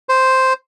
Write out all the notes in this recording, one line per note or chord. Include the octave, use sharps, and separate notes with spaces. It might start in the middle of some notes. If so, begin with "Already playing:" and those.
C5